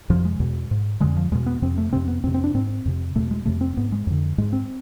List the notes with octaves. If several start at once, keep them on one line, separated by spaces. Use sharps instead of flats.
F2 C3 F3
G#3
E2 B2
G#2
F2 D3 G#3
F3
E2 B2 G#3
B3
F2 C3 C4
A3
F2 C3 C4
B3
F2 C3 C4
C4
D4
G#2 C4
F2 C3
E2 B2 A3
G#3
F2 C3 A3
C4
G#2 B3
G#3
F2 D3
G#2 G#3
C4